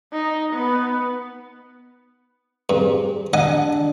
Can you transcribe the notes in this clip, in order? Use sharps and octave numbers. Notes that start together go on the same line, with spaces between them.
D#4
B3
G2 C4 G4 G#4
D4 D#5 F#5 G#5